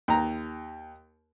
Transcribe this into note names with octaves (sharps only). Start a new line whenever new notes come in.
D#2 A#5